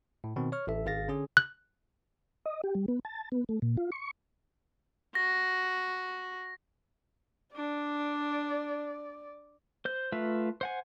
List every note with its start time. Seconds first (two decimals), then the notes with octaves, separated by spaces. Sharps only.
0.24 A2
0.36 B2 D#3 C4
0.52 C#5 C#6 F6
0.67 A1 A4 E5
0.86 G#1 G#4 F5 A6 A#6
1.08 D3 C#4 G#4
1.37 F#6
2.45 D#5
2.64 G4
2.75 G3
2.88 B3
3.05 A5
3.32 B3
3.49 A3
3.62 A#2
3.77 F4
3.92 C#6
5.15 F#4 A#6
7.56 D4 D5
9.85 C5 G6
10.12 A3 F4 B4 E5
10.61 C5 F#5 G#5